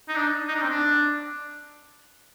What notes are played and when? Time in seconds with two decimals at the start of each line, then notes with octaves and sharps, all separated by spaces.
0.09 D#4
0.16 D4
0.48 D#4
0.56 D4
0.62 C4
0.69 D4